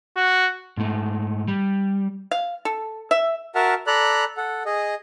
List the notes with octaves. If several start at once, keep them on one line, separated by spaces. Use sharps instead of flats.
F#4
G#2 A3
G3
F5
A4
E5
F#4 A#4 E5 F#5 A5 F6
A4 D5 A#5 B5 F#6
A4 F#5
G#4 D#5